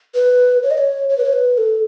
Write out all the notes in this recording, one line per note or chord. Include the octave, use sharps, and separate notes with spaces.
B4
C#5
D#5
C#5
C#5
B4
C#5
B4
A4